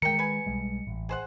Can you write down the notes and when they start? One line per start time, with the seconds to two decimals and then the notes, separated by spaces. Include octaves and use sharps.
0.02 D#3 G#3 A#4 G5 C#7
0.19 B4 G#5
0.46 B1 G3 G#3
0.87 A1
1.09 G#4 C5 F#5